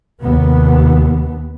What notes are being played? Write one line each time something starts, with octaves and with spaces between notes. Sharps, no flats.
D#2 C3 B3